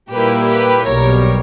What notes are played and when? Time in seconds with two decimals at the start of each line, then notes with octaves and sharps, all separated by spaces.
0.10 A#2 G3 A#3 E4 G4 B4
0.48 G4 B4
0.86 B1 B2 G3 A#4 C#5